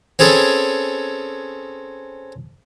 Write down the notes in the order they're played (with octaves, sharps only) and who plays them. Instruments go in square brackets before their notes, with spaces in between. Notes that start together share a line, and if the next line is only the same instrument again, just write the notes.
[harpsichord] C4 C#4 G#4 A4 B4